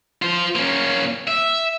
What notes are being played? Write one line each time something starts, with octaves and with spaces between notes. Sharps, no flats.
F4 C5
A#3 C#4
E5